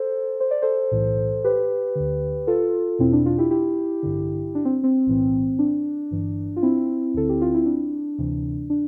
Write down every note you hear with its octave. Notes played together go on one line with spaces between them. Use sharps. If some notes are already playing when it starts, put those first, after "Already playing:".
Already playing: A4 C5
C5
D5
A4 C5
B1 A2 E3
G4 B4
D2 D3
F4 A4
E2 B2 C4 E4
D4
D4 F4
E4 G4
E4 G4
A1 G2 D3
D4
C4
C4
B1 A2 E3
D4
G1 G2 E3
F4
C4 E4
D2 D3 A4
G4
F4
E4
D4
D2 C3 E3
D4